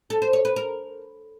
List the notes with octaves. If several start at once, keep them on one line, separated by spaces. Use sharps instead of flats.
A4
C5
C#5
B4
A#4